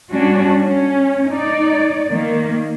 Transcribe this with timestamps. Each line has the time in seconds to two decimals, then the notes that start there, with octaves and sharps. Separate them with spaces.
0.11 G3 C#4 D4 F#4
0.61 C#4
1.27 D#4 D5
2.09 D#3 A#3